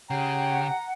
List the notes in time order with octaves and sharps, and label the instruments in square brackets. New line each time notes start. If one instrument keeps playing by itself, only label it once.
[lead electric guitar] C#3 [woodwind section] G4 C#5 G5 [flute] F#5 [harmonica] A#5